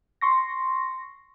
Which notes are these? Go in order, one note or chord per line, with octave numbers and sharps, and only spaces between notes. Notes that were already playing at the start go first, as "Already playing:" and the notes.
C6 C#6 A#6